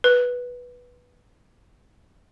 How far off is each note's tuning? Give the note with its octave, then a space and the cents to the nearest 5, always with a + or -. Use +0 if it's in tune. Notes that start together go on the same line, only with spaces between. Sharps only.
B4 -5